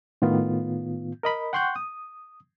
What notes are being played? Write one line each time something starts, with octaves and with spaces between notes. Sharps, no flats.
A2 D#3 B3 F4
A#4 D#5 B5
F#5 G5 C6 C#6 F#6 G6
D#6